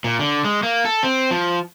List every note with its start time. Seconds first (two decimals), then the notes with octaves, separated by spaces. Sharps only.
0.04 A#2
0.19 D3
0.44 G#3
0.63 A#3
0.85 A4
1.03 C4
1.31 F3